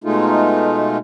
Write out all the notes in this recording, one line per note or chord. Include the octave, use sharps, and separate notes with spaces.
B2 G#3 A3 D#4 F4